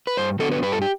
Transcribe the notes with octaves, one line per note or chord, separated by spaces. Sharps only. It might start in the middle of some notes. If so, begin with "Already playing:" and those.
B4
G2 C5
D3 F#3 B3 D4 A4
B4
G2 B4
A4
G4